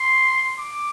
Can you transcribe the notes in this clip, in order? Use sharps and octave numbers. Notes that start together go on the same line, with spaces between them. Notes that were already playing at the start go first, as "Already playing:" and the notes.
Already playing: C6
D6